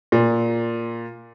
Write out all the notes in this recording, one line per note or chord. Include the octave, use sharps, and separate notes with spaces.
A#2